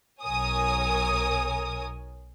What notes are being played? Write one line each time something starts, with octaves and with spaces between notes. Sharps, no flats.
B1 A#4 C#5 G#5 D#6